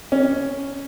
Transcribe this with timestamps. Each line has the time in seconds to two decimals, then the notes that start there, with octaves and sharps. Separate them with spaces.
0.12 C#4